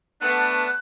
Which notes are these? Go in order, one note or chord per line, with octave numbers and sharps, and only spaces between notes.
A3 B3 D4 F#6